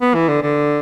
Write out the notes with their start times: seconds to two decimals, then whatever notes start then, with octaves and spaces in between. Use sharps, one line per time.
0.01 B3
0.14 E3
0.29 D3
0.42 D3